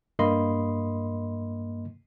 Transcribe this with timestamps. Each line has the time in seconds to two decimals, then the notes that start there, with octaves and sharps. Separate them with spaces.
0.19 G2 A#3 D#5 B5 C6